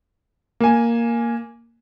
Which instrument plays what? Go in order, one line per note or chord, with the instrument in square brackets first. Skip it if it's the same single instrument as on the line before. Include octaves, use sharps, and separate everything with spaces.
[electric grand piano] A#3 G#5